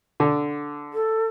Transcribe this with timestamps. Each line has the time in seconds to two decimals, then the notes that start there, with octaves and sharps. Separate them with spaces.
0.20 D3
0.93 A4